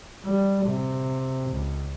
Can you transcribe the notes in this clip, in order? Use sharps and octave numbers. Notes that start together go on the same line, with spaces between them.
G3
C3
C#2